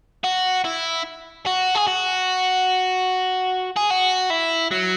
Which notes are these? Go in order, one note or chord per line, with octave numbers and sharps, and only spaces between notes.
F#4
E4
F#4
G#4
F#4
G#4
F#4
E4
F#3